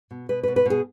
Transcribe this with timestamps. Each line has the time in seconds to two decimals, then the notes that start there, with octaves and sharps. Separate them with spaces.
0.11 B2
0.29 B2 B4
0.43 B4
0.48 B2
0.56 B4
0.66 B2 G#4